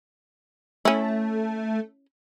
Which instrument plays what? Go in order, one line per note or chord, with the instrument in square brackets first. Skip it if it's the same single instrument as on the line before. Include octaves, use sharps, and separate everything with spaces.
[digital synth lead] A3 [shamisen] C#4 E4